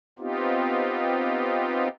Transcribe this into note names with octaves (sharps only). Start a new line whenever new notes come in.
B3 C4 D#4 F4 G4